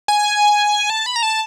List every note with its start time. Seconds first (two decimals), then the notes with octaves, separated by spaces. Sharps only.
0.08 G#5
0.90 A5
1.06 B5
1.16 A#5
1.23 A5